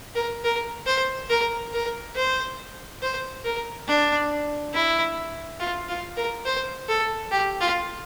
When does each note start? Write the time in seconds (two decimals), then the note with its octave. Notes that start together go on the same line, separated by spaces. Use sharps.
0.15 A#4
0.44 A#4
0.86 C5
1.30 A#4
1.73 A#4
2.16 C5
3.02 C5
3.45 A#4
3.88 D4
4.74 E4
5.60 F4
5.89 F4
6.17 A#4
6.45 C5
6.88 A4
7.31 G4
7.60 F4